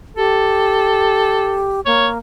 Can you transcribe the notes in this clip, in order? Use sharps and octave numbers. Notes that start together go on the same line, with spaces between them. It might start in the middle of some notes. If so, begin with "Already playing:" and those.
G4 A4
A#3 C#5